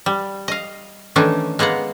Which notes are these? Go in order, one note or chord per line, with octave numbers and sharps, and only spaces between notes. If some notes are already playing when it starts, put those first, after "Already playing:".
G3
D#5 F5
D#3 E3 A3 C#4 D4
G#3 A#3 B3 F5 F#5